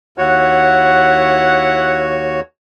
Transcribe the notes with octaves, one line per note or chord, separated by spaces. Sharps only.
D#2 E4 F#4 C#5 F#5